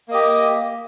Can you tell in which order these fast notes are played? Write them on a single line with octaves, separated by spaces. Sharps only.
A#3 D#5 G4